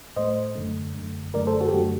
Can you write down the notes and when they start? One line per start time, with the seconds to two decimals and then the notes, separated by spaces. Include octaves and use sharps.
0.16 A2 A3 C5 D#5
0.56 F#2 D3 A3
0.95 F#2 D3 A3
1.34 F#2 D3 A3 A#4 D5
1.47 A4 C5
1.61 F#4 A4
1.69 G4
1.73 F#2 D3 A3 F#4